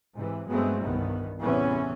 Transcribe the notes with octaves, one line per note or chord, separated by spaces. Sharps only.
G#2 C3 E3
G2 F#3 G#3 A3 B3 C4
G1 C2 G2 D#3 B3
A1 E2 C3 E3 B3 C#4